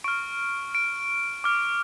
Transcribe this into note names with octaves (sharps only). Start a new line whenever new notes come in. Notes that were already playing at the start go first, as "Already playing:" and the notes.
C#6 F6 D7
D7
D6 F6